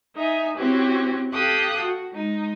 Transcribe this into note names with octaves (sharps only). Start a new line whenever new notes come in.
D#4 E5 G#5
C4 C#4 E4 F#4 G4
G4 A4 F5 G5 D#6 F#6
F#4
G#3 D#4